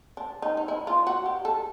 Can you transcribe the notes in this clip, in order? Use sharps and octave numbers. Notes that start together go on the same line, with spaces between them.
D4
D#4
D#4
E4
F4
F#4
G4
A4